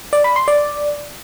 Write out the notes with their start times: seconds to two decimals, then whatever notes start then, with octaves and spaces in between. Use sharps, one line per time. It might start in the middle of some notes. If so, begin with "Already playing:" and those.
0.13 D5
0.24 B5
0.36 C6
0.48 D5